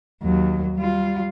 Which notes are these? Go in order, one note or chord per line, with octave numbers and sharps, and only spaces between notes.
D#2 F#3
G3 F4